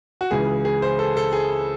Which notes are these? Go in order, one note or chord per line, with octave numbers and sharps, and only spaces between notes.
F#4
C#2 C#3 E3 G#4
G#4
C5
A4
A4
G#4